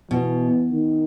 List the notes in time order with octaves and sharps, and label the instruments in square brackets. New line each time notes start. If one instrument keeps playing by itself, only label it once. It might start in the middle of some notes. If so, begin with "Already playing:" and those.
[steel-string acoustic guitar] B2 [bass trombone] E3
[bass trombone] D#3